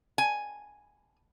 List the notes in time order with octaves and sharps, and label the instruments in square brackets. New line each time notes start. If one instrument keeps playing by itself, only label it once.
[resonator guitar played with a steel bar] G#5